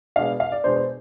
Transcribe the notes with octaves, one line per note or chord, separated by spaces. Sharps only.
B2 G#3 D4 F5
F5
D5
B2 G#3 D4 C5
C5